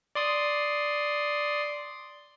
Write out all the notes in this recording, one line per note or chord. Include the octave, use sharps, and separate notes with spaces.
D5 C6 D#6